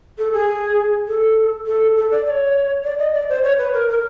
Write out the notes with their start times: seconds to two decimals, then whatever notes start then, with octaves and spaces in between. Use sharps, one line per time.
0.18 A4
0.33 G#4
1.07 A4
1.67 A4
1.96 A4
2.11 D5
2.26 D5
2.30 C#5
2.84 D5
2.99 D#5
3.14 D5
3.29 C5
3.43 C#5
3.58 B4
3.74 A#4
3.88 A#4